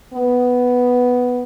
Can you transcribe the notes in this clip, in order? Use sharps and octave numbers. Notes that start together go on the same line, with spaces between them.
B3